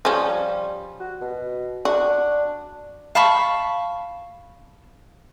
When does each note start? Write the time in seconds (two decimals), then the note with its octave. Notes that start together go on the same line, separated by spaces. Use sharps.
0.05 F3 G3 C#4
1.00 F#4
1.21 B2
1.85 D4 F#4
3.15 F5 A5 B5 C#6